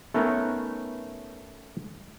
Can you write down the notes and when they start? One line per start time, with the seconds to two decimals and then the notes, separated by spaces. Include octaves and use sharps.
0.14 A3 B3 C#4 D#4 A#4 C#5